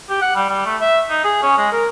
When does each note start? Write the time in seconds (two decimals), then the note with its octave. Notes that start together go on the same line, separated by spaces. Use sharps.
0.10 G4
0.22 F#5
0.35 G3
0.49 G3
0.66 A3
0.81 E5
1.10 D#4
1.24 G#4
1.42 C#4
1.58 G#3
1.72 A#4